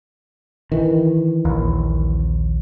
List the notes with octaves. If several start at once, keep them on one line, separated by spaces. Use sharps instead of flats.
D#3 E3
A#1 D#2